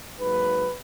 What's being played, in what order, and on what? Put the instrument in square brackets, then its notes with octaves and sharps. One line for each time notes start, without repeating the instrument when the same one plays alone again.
[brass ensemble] G#2 F#3 A#3 B4